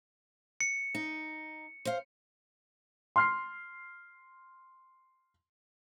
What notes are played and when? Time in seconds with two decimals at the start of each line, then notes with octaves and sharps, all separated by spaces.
0.61 C#7
0.95 D#4
1.85 C5 F5
3.16 C6 F6 C7